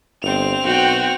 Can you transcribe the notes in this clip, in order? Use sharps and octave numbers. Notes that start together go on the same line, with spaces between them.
G1 C4 F7
B1 F#4 G5